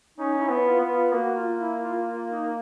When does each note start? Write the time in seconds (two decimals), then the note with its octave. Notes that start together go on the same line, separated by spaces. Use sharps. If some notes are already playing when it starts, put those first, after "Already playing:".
0.18 C#4 D#4
0.34 D#4
0.41 E4
0.49 B3
0.65 F4
0.81 B3
0.89 F4
1.12 A#3 F#4
1.36 F4
1.60 E4
1.82 F4
2.06 F4
2.29 D#4